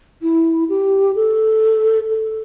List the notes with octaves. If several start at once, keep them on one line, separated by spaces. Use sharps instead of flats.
E4
G4
A4
A4